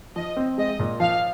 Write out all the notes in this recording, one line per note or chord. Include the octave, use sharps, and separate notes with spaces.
F3 D#5
C4
G#3 D#5
A#2
F3 F5